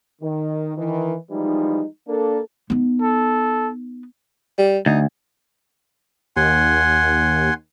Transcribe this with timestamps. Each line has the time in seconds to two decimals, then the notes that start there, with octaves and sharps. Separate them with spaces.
0.22 D#3
0.77 D#3 E3
1.31 E3 F3 G3 G#3 D#4
2.08 A#3 D4 A4 A#4
2.70 B3 D#4
3.01 A4
4.58 G3
4.86 D2 D#4
6.36 D#2 F#5 G#5 C6